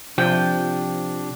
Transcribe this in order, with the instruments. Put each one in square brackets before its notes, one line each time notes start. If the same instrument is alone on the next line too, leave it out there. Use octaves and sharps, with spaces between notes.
[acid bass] C3 [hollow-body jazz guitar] F3 [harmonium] D4 [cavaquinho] G5